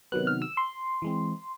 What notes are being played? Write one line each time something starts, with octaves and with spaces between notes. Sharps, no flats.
C3 D#3 F#3 B3 F#6
F6
E6
C6
E3 G#3 C4